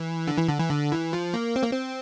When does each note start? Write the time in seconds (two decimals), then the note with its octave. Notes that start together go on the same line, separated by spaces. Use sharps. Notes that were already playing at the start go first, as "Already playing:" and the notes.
Already playing: E3
0.27 D3
0.38 E3
0.48 D3
0.59 E3
0.70 D3
0.92 E3
1.13 F3
1.34 A#3
1.56 C4
1.63 A#3
1.72 C4